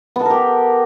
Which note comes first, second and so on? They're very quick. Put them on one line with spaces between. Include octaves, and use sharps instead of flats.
B3 A4 A#4 G4